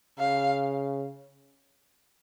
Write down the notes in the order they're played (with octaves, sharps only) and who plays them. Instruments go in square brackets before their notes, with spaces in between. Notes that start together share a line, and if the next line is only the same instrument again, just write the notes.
[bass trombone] C#3 [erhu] F5